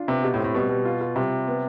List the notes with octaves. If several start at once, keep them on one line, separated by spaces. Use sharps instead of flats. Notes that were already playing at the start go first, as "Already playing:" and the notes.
Already playing: D4 F4
C3 B3
B2 G4
A2
C4
A2
B2 G3
B2 G3
F4
F4
C3 G3
G3
B3